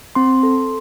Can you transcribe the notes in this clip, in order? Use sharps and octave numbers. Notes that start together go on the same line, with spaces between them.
C4 C6
A4